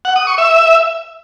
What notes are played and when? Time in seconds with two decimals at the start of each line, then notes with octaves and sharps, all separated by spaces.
0.05 F#5
0.16 D#6
0.27 C#6
0.38 E5